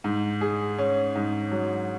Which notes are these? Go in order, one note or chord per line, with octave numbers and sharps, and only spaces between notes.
G#2
G#4
C#4
G#2
F#3